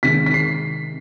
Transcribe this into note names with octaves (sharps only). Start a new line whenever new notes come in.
C3 D#3 G#3 B6
B6
C7